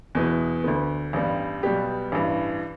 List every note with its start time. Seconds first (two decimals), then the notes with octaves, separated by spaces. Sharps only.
0.15 E2 B2 B3 E4 B4
0.64 D2 D3 B3
1.13 A1 G2 G3 B3
1.63 B1 B2 G3 B3 G4
2.12 A1 G2 E3